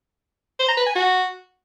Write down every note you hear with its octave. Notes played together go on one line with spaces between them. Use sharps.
C5
A#5
B4
G#5
F#4